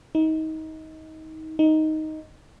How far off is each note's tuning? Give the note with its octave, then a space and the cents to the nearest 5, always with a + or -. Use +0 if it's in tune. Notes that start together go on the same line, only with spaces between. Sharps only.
D#4 +25
D#4 +5